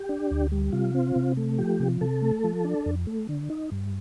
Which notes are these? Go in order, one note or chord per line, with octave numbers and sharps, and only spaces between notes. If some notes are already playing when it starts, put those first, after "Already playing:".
Already playing: G4
D4
D2
G3
C3 F4
C4
C3
A3
F3 G4
C3
C3 A4
A3
F3
D4
F2
A3
D3
D#4
G2